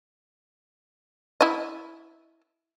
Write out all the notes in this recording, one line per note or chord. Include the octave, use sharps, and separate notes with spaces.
E4 D#5